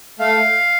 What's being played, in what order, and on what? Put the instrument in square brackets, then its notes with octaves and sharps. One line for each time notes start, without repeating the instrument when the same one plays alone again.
[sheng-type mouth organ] A3 F5